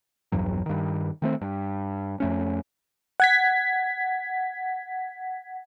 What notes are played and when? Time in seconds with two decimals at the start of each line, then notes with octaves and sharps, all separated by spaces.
0.32 A#1 E2 G2 F#3
0.66 G2 D#3
1.22 D#3 A3 C4
1.41 G2
2.20 F2 A3 C#4
3.20 F#5 G#6 B6